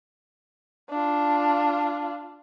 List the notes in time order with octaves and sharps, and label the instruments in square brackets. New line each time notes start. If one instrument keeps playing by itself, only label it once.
[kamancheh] D4 F4